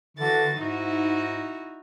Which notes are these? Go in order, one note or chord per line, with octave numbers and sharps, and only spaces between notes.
D3 E3 F#4 A6
G#2 D#4 E4 F#4